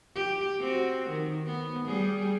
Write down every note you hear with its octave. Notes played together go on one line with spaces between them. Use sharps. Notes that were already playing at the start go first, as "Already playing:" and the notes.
G4
C4 F#4
D#3
B3
G3 G#4